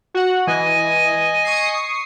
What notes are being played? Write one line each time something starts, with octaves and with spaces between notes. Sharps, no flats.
F#4 F#5
E3 D#5 G#5
C#6 D#6 C7